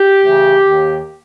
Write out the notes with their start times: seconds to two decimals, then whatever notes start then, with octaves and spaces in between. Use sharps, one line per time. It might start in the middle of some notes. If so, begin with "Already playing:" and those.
Already playing: G4
0.21 D2 C#3 E3
0.64 D#2 D#3